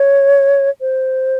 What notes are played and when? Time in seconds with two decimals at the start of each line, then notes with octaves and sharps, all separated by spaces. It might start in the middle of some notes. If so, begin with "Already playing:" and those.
Already playing: C#5
0.81 C5